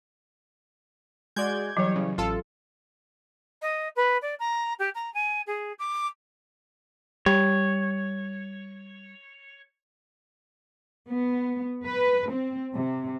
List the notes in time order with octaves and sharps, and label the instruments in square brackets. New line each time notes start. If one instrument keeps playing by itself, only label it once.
[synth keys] G#3 F#4 D5 [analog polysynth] G6 G#6
[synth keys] E3 G3 C#5 [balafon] F#3
[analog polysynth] C#3
[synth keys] A1 [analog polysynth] F4 A4
[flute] D#5
B4
D5
A#5
G4
A#5
G#5
G#4
D6
[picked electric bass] G3 [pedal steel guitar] C#5
[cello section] B3
B4
C4
C3